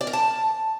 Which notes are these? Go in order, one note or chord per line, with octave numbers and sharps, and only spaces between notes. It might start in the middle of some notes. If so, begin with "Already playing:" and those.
D5
A#4
A5